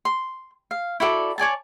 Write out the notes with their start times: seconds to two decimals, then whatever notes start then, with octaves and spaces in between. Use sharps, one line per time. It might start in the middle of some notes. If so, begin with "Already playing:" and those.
0.05 C6
0.71 F5
1.00 E4 F#4 A4 D5
1.38 C#5 D5 G#5 A5